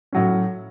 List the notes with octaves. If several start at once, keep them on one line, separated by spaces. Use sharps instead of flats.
A2 F#3 C#4